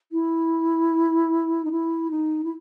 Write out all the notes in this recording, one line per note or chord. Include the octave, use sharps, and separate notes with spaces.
E4
D#4
E4
D#4
E4